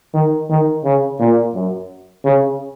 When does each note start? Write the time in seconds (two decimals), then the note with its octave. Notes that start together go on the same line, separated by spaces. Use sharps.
0.14 D#3
0.50 D#3
0.85 C#3
1.19 A#2
1.55 F#2
2.25 C#3